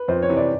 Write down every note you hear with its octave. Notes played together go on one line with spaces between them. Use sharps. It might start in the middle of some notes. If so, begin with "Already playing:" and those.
Already playing: B4
F2 C5
C#5
C3 E3
D5